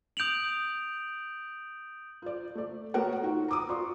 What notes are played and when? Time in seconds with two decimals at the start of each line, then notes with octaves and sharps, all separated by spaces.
0.17 D#6 G6 D7 F7 F#7
2.22 F4 D5
2.55 A3 D5
2.94 A3 B3 F#4 A#4 C#5 F#5
3.23 D#4 F4 F#4
3.48 A#5 D6 D#6
3.69 F4 F#4 D5 C6 C#6